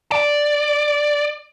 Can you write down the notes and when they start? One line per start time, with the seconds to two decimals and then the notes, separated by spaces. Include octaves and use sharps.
0.12 D5